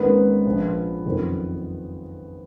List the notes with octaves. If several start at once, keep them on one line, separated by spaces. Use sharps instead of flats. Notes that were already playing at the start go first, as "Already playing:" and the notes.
Already playing: G#1 G#2 D#3 A#3 B3 C#4 B4
A#1 A#2 F3
F#1 F2 D#3